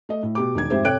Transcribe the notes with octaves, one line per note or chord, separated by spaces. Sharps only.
A3 D#5
A2
B2 G4 D6
E1 D#3 D#4 G#6
F2 G#2 G4 C5 E5
C3 A4 C#5 G5 F#6 D7